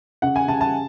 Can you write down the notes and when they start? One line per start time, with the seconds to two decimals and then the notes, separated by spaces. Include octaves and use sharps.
0.22 C#3 F#5
0.36 G#5
0.48 C#3 A5
0.61 A5